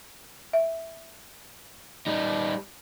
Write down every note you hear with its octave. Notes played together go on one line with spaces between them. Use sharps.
E5
G3 D#4